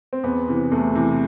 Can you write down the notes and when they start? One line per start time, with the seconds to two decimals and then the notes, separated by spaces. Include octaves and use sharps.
0.13 C4
0.24 E2 B3
0.48 C3 E3
0.72 E2 A3
0.95 C3 E3